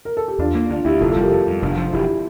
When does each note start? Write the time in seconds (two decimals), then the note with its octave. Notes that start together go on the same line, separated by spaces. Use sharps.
0.05 A#4
0.17 A4
0.28 G4
0.39 E2 D4 F4
0.55 A#3
0.70 D2 D4 F4
0.85 D2 E4 G4
1.00 F1 F4 A4
1.11 F4 A4
1.16 G3 G4 A#4
1.31 F2 F4 A4
1.47 F2
1.62 F1 D4 F4
1.77 F3
1.92 E1 E4 G4